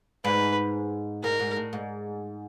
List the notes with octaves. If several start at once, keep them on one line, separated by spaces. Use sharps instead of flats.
G#2 B4
G#2 A#4
G#2
A2
G#2